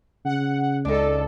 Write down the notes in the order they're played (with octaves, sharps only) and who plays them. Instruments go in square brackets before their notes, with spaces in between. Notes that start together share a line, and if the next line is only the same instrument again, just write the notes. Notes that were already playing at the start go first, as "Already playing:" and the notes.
[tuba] C#3 [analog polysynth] F#5
[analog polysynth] C#2 A4 [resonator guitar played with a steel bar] D4 D#4